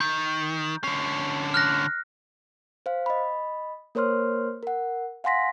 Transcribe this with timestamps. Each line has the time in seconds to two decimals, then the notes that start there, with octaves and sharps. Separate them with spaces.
0.01 D#3 G6
0.84 D3 C#4 C7
1.54 F6 F#6 A#6
2.86 C5 F5
3.06 D#5 B5
3.95 A#3 A#4 C5 C#5 C6 F6
4.63 A#4 F#5
5.24 F5 F#5 G#5 C6 A#6 B6